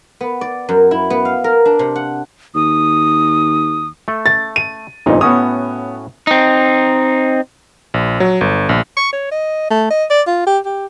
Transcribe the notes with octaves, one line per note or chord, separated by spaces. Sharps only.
B3
D5
F#2
E4
B3
F5
A#4
D4
C3
F#5
D#2 D#6
A3 A4
A6
D#7
G1 F2 A#2 D#4
A2 B3 C#4 F#4 D#6
C4 D#4
A#1
F#3
G1
A#1
C#6
C#5
D#5
A3
D#5
D5
F4
G4
G4